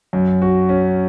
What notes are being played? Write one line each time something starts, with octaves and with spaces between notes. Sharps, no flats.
F#2
F#4
C#4